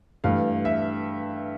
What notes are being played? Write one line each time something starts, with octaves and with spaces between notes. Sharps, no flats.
G2 E3 A3 F5
E5